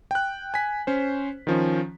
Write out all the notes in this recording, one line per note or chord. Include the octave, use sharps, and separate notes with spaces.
G5 F#6
G#5 B6
C#4 C5
D#3 F3 C#4